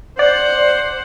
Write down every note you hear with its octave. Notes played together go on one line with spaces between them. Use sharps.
C5 D5 F#5